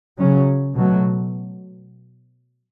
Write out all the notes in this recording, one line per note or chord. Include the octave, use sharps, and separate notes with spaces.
C#3 F#3 C#4
B2 F#3 A3